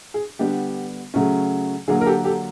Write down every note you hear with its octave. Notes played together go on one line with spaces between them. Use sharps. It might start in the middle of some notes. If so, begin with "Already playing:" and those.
G#4
D3 G3 B3 D4 G4
C#3 F#3 A3 C#4
D3 F#3 A#3 G#4
A#4
G4 A4
G4 A4